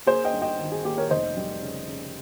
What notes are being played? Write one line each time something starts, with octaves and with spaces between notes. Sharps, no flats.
A#3 G#4 C5
D#5 G5
G2
D#5 G5
D#3
G#4
A#3 G4
A#4 C#5
F1 C5 D#5
G3
C#3
C#3